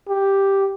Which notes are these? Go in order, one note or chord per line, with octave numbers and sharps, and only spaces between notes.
G4